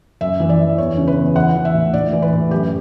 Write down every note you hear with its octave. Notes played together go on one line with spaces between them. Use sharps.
F#2 E5
E3
D5
E3
E2 C#5
C#3
B4
E2
E3 F#5
E3
E5
A2
A2 D5
E3
B4
A2
F#2 G4